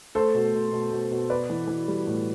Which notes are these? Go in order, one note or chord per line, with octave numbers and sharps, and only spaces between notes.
A3 A4 C5
B2
B2
B2
B2
B2
B3 B4 D5
E3
E3
G3
A2